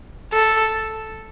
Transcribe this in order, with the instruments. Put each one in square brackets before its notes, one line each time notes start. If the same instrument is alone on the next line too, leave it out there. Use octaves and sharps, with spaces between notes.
[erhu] A4